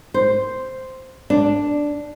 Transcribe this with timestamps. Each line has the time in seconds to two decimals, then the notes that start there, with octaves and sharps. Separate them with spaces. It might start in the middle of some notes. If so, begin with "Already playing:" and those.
0.14 C5
1.30 D4